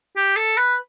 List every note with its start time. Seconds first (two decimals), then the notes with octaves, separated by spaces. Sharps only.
0.16 G4
0.36 A4
0.57 B4